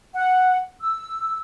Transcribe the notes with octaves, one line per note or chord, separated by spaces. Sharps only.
F#5
E6